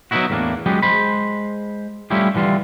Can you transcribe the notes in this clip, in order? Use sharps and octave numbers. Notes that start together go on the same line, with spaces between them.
F#3 B3 C#4 D#4 E4 F#4
E2 A2 A#3 C#4 D4
F#3 G#3 B3 C#4 G4
G#3 C5 B5
G3 A3 C#4 E4 F4 G4
D3 E3 G3 F4